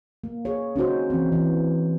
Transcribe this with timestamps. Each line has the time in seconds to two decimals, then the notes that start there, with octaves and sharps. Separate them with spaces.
0.24 A#3
0.45 G#4 C#5
0.76 C#4 D#4 F#4 C5
1.10 E3 C4
1.32 E3